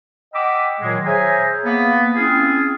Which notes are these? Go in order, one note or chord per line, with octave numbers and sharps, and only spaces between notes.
D#5 F#5 G5 B5 D6 E6
A#2 D#3 F#3 G#3
G#4 C5 C#5 E5 G#5 A#5
A#3 B3
C4 C#4 E4 F4 G#4